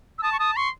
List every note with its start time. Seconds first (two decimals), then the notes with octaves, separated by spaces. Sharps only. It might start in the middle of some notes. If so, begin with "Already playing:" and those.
0.19 E6
0.23 A5 D#6
0.32 C#6
0.39 A5 D#6
0.56 C6 C#6